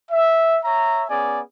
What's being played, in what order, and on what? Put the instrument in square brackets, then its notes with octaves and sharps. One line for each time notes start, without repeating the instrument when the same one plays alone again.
[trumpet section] E5
C#5 E5 A#5
B3 C#4 G#4 D5 G#5